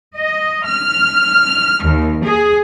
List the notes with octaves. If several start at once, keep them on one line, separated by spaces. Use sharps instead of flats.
D#5
F6
D#2
G#4